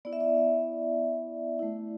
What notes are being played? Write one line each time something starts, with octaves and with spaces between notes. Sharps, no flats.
B3 E4 D5
E5
D5
A3 E4